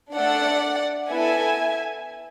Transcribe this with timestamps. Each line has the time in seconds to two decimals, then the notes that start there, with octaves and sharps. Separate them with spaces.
0.16 A3 D4 A4 D5 F#5
1.09 B3 E4 A4 E5 G#5